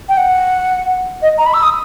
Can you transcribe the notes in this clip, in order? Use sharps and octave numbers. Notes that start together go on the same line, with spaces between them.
G5
F#5
D#5
A#5
B5
E6
D#6